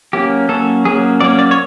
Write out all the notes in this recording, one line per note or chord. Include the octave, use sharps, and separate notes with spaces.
F#3 A#3 C#4 G4
F#3 A#3 C#4 A4
F#3 A#3 C#4 G#4
F#3 A#3 C#4 D5
D5
C#5